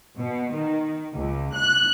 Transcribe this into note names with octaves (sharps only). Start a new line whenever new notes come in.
B2
D#3
C#2
F#6